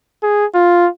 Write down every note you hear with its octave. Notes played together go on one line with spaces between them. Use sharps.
G#4
F4